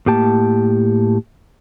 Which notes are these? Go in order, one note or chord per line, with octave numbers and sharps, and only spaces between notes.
A2 A#3 G4 A5